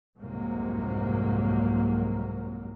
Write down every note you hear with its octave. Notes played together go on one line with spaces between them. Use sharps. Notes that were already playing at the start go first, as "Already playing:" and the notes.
C2 F2 G#2 C3 F#3 A#3